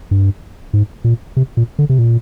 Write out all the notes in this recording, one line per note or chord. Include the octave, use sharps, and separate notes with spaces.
G2
G#2
A#2
C3
A#2
D3
C3
A#2